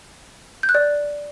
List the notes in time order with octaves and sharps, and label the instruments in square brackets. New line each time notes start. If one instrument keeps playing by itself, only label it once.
[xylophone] G6
F#6
D5